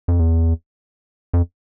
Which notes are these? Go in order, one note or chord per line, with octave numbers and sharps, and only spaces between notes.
F2
E2
F2